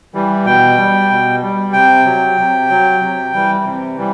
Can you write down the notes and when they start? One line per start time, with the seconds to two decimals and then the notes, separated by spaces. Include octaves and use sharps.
0.14 E3 G3
0.45 B2 G5
0.77 G3
1.10 B2
1.42 G3
1.73 C3 G5
2.05 F#3
2.37 C3
2.69 F#3
3.00 C3
3.34 E3 G3
3.65 C3
3.96 E3 G3